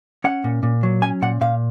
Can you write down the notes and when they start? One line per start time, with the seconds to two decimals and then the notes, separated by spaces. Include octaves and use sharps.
0.24 C#4 F#5
0.44 A#2
0.63 A#2
0.83 F#3
1.02 C#4 G#5
1.22 A#2 F#5
1.41 A#2 F5